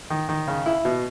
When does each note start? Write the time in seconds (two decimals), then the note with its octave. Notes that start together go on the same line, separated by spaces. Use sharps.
0.10 D#3
0.29 D#3
0.48 C#3
0.66 E4
0.85 B2